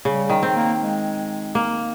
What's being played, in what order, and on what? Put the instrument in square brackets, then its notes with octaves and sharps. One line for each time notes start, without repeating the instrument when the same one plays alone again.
[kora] C#3 [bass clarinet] G3
[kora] D#3
C4
[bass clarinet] A#3
G#3
[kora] A#3